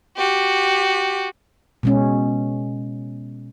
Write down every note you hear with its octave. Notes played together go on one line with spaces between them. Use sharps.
F#4 G4
B2 G#3 C#4